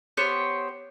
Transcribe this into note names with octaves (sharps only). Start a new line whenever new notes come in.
B3 G4 C5 C#5